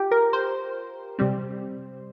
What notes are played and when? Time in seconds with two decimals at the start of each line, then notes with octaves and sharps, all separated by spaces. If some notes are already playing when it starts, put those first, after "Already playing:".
Already playing: F4 G4
0.11 A#4
0.33 C5
1.19 C3 G3 C4